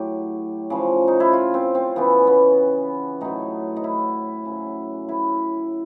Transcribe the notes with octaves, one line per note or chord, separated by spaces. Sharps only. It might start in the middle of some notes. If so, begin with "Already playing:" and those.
Already playing: A2 F#3 G4
C#3 F3
D#4
E4
F4
C4
C4
C#3 E3 B3
B3
A2 F#3 D#4
D#4
E4
C#3 F#3
E4